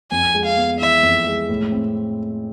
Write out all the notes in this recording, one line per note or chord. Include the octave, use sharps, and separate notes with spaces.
F2 G#5
G#3
F5
B3
E3 E5
F2
G#3
A2
C4